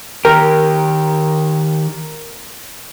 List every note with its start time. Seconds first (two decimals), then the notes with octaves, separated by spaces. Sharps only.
0.25 D#3 G4 A#4